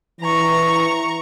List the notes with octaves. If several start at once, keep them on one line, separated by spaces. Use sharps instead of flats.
E3 A#5 C#6